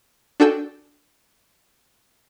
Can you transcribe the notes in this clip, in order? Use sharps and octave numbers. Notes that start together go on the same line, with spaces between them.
D4 F#4 A4 G5 G#5 E6